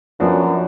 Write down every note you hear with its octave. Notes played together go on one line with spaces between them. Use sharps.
F#2 F3 B3 D4 F#4